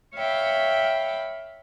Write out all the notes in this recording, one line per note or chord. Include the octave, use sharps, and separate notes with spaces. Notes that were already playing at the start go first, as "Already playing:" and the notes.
C#5 E5 F5 G5 B5